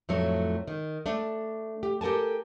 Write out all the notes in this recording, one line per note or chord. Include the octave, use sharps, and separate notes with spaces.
F2 A2 F#3 A3 C#5
D#3
A3 D4
G4
G4 A4 A#4 G#5 A5